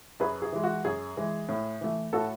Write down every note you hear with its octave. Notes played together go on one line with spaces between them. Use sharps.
F#2 G#4 B4
G#4
E3 G#3
F#4
F#2 G#4
E3 G#3
A2
E3 A3
A2 F#4 A4